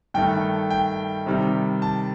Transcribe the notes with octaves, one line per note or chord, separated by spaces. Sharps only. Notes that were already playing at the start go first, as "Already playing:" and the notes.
G2 D#3 A3 G5
G5
C3 D#3 G3
A5